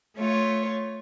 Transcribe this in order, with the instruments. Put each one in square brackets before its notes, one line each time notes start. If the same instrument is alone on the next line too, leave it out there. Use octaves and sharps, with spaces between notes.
[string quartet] A3 F4 C#5